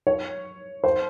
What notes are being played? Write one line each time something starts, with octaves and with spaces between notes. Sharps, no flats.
C#5
C5